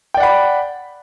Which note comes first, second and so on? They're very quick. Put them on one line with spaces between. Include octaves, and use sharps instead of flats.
G5 D5 F#5 B5